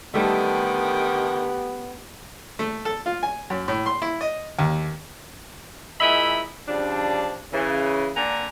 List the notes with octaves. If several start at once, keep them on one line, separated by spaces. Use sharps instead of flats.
D3 D#3 G3 A3 B3 G4 E5
A3
A4
F4
G#5
F#2
A2
C6
E4
D#5
D#2
A#2 G#3 E4 D#5 E5 B5
C#3 F3 G3 D4
C#3 E3
D3 A#3 D4 F#5 G#5 A#5